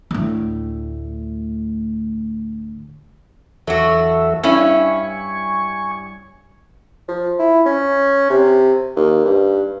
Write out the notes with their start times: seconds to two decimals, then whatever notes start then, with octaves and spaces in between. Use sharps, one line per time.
0.11 D2 A2
3.67 E2 F#3 F#4 A4 E5
4.43 G2 C#4 E4 G#5 C#6
7.08 F3
7.39 E4
7.66 C#4
8.30 C3
8.96 D#2
9.25 G2